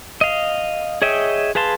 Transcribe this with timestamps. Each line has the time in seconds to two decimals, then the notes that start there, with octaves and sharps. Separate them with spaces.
0.21 D#5 F5
1.02 G#4 C#5 D#5 E5 G5
1.55 G#4 B4 F5 A5 C6